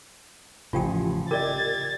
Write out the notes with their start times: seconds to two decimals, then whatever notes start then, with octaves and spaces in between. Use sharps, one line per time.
0.73 A1 C#3 F3 F4 G4 G5 G#5
1.31 G4 A#4 D5 D#5 G#6 A6